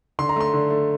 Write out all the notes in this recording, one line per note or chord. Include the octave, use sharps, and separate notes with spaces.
D3 C6
A#5
A3 C6
D3
A3